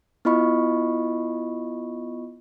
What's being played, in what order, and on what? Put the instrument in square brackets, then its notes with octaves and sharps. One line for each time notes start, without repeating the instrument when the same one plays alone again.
[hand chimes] B3 E4 F4 D#5 B5 C#6